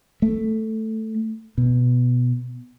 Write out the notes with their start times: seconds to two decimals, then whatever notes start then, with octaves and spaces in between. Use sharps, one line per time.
0.22 A3
1.58 B2